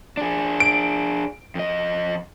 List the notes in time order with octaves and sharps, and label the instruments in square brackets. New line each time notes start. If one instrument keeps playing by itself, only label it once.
[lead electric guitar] D4 G#4
[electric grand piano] D7
[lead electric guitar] F2 D#5